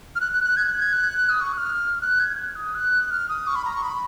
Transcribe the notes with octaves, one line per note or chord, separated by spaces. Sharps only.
F6
F#6
F#6
F#6
G#6
F#6
G#6
F#6
D#6
C#6
F#6
F6
F#6
G#6
F#6
D#6
F#6
F6
D#6
C#6
B5
A#5
C#6
B5